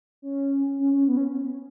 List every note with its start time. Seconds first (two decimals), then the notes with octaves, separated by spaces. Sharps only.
0.22 C#4
0.79 C#4
0.93 C#4
1.08 B3
1.17 C#4